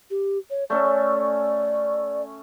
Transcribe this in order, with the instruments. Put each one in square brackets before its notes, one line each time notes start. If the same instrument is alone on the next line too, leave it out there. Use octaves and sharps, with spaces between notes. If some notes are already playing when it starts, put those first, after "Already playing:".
[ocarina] G4
C#5
[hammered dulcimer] A3 C#4 A4 [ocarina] D5